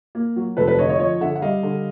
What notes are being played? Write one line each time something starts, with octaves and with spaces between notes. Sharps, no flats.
A#3
F#3
F1 A4 B4
A4 B4
D3 C#5 D#5
C#5 D#5
F3 C#5 D#5
D3 E5 F#5
F#5
G3 D#5 F5
D3